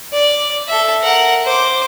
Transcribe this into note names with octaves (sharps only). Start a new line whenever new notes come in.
D5
A4 E5
A#4 F#5
C5 D6